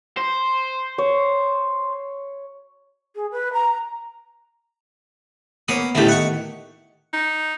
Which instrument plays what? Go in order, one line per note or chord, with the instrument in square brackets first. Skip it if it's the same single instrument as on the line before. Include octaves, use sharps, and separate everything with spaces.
[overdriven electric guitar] C5
[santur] C#5
[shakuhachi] G#4
B4
A#5
[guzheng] A#3 B3 [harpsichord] C#4 D#6
[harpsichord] D2 A2 G4 [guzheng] D#3 E4
[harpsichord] F#5 C#6
[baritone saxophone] D#4